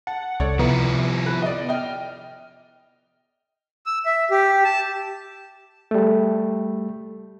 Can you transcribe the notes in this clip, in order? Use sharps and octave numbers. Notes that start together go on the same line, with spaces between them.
F#5 A5
C#2 A4 C#5 D5
C3 F3 B3 E4 A#5 C#7
B4
D5 D#5
D#5 G5 F6
E6
E5
G4
A5
G3 A3